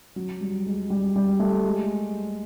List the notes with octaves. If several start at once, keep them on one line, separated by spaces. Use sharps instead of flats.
F#3
G3
G#3
G3
G3
A3
G#3